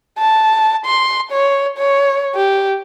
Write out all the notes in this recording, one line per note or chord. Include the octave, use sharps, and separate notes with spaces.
A5
C6
C#5
C#5
G4